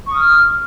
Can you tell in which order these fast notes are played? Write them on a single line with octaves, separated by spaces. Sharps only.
C#6 D#6 F6